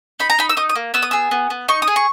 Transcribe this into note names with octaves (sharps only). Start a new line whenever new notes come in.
D#4 B5
A#5
D#4 B5
E6
D#4 D#6
D#6
A#3
B3 E6
D#6
G#4 E6
B3
B3
D#4 C#6
D#6
G#4
C#6